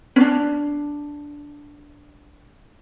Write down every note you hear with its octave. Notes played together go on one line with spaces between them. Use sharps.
C#4 D4